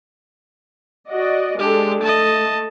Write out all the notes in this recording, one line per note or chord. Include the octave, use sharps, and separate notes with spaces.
F#4 D5 D#5
G#3 D4 G4 A4
A3 D#5 A5